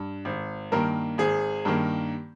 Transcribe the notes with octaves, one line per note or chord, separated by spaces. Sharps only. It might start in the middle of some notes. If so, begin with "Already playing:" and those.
Already playing: G2
G#1
G2 D#3 A#3 A#4
G#1 G#4
G2 D#3 A#3